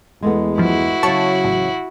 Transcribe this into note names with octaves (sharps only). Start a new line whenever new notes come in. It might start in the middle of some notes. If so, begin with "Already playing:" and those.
E2 G#3 A3 B3
G2 F3 E4 F#4
C#3 F#3 C#5 A5 C#6
A1